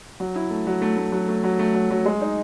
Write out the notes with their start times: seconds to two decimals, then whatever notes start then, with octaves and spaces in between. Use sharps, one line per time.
0.20 F#3
0.36 E4
0.51 A3
0.67 F#3
0.82 A3
0.97 A3
1.12 F#3
1.28 A3
1.44 F#3
1.59 A3
1.74 F#3
1.90 F#3
2.06 G#3
2.21 D#4